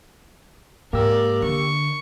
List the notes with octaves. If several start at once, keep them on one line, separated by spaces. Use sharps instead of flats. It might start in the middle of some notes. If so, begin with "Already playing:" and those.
G#2 A#3 G4 A#4 D5 E6
D3 C#6